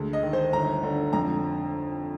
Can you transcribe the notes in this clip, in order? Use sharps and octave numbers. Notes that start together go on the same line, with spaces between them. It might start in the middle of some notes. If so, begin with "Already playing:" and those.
Already playing: D2 G#3
D#5
D#3
C5
G1 A#5
D3
F2 A#5